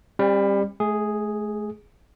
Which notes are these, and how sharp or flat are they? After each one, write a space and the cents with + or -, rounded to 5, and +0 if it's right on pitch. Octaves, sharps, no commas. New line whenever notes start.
G3 +25 C#4 -45
A3 -40 G#4 +0